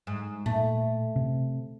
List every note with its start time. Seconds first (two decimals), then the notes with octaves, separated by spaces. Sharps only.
0.07 G#2
0.46 A#2 A3
1.16 C3